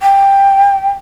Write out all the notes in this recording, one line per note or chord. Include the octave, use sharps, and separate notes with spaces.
G5